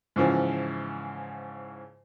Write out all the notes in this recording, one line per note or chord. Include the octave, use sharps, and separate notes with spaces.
G#2 C#3 E3 F3